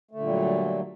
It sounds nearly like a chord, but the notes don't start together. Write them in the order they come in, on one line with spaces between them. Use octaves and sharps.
A3 D3 A#2 G3 F#3